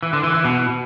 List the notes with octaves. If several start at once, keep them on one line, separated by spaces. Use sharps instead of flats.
E3
D3
E3
E3
B2